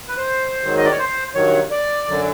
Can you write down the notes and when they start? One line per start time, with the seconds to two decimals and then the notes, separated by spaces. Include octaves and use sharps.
0.08 B4
0.17 C5
0.62 G#2 D#3 F#3
0.78 D#5
0.85 D5
0.92 C#5
0.99 C5
1.35 G2 D#3 F#3 C#5
1.71 D5
2.08 F#2 D3 F#3